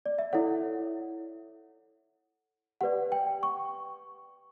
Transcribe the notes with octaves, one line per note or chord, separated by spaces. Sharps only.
D5
E5
E4 A4 C#5 F#5
G4 B4 D5 F#5
G5
C#6